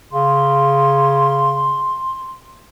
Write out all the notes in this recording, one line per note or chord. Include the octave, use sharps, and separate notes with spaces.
C#3 C6